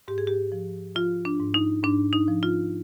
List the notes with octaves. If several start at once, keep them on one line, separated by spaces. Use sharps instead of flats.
G#2 G4
G#4
G4
F3
F3 F4
D4
G#2
D#4
G#2 D4
D#4
F3
F4